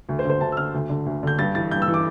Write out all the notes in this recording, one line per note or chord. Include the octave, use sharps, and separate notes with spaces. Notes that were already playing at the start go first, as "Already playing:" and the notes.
D2
C5
D3
C5
D2 A5
E6
D3 F6
D2
D3
D2
D3 G6
G2 A6
E3 A6
G2 G6
E6
E3
D6